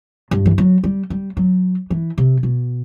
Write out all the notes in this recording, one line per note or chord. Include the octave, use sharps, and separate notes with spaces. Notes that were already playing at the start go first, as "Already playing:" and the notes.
G2
E3
F#3
G3
G3
F#3
E3
C3
B2